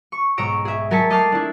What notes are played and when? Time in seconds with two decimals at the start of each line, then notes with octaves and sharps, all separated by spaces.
0.12 C#6
0.38 B1 G#2 C#5 A#5 E6 D7
0.65 G#4 E5
0.91 F#3 A#4 G#5 A5 B6 C#7
1.10 A3 D#5 A5 D6 F6 C7
1.32 D4 E4